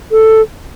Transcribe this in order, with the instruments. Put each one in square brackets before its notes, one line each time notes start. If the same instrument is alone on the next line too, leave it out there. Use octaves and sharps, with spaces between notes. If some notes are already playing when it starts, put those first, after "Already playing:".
[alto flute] A4